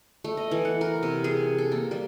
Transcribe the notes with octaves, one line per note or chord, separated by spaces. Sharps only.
A3
D#5
E3
F#5
A#4
C3
G#4
A4
A#3
G3